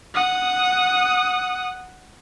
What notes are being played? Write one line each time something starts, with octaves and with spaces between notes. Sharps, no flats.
F#5 D#6